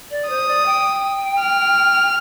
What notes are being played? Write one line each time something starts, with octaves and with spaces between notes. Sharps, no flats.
D5
C5 D#6
D5
G5
F6